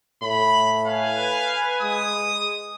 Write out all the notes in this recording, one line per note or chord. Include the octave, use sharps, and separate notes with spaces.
A2 B5
B4 F5 G#5
G#3 D#6